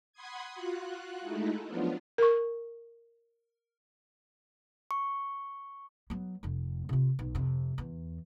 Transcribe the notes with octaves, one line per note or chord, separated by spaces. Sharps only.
F#5 B5 C6 D#6 G#6
F4 F#4 F#6
G#3 A3 D#4 E4
F3 F#3 B3 D4 F4
A#4 C#6
C#6
F#3 B3
F1 F2
C3 F4
B1
F2 C3
E2